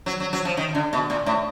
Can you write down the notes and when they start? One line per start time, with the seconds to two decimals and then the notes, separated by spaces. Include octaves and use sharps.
0.06 F#3
0.20 F#3
0.33 F#3
0.45 F3
0.57 D#3
0.75 D3
0.93 B2
1.10 A#2
1.26 A2